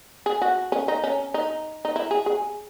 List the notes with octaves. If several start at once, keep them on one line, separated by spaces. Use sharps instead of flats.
G#4
F#4
C#4
D#4
C#4
D#4
D#4
E4
G#4
G#4